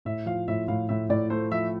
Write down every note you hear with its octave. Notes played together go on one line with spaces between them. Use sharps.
A2 E5
F3 F5
A2 E5
A2 F5
A2 E5
A2 D5
A3 C5
F3 E5